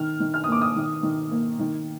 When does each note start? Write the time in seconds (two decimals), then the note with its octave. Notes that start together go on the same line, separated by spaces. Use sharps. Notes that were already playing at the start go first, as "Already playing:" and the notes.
Already playing: D#3 F6
0.20 D#3
0.34 F6
0.44 D#6
0.48 A#3 D6
0.61 D#6
0.76 D#3
1.03 D#3
1.31 A#3
1.59 D#3